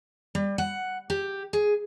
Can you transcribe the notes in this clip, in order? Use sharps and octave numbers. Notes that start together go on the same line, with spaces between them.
G3
F#5
G4
G#4